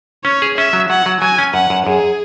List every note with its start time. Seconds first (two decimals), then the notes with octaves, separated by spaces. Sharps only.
0.25 C#4 C#5
0.42 G#4
0.58 C#4 E5
0.73 F#3
0.90 F#3 F#5
1.06 F#3
1.21 F#3 G#5
1.38 C#4
1.54 F#2 F#5
1.70 F#2
1.86 F#2 G#4